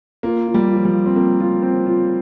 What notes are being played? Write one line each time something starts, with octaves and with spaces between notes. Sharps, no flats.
A#3 F4
F4
G3
F4
F3
G3
F4
C4
A#3 C4
F4
C4
F4